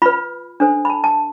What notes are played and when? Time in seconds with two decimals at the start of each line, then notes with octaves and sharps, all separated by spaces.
0.02 F4 B4 B5
0.60 D4 A4 C5
0.85 B5
0.90 A5
1.04 A5